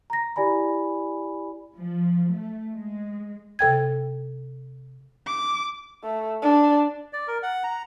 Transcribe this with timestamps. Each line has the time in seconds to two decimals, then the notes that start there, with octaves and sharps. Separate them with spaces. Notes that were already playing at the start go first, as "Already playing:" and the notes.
0.10 A#5 A#6
0.36 E4 G4 D5 G#5 B5
1.78 F3
2.32 A3
2.75 G#3
3.59 C3 A4 G5 G#6
5.27 D6
6.04 A3
6.42 D4
7.13 D5
7.28 A#4
7.43 F#5
7.64 A#5